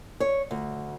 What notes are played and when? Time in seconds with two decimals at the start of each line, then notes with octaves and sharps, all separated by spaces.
0.20 C#5
0.51 D2